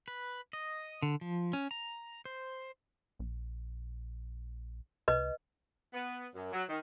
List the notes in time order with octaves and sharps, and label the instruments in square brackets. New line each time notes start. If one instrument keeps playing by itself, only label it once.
[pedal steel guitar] B4
D#5
D3
F3
C#4
A#5
C5
[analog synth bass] A#1
[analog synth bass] C2 [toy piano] B4 D#5
[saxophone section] B3
F#2
F#3
D#3